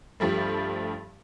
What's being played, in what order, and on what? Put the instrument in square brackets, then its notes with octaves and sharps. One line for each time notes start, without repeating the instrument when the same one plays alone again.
[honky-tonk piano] G2 F3 G3 A3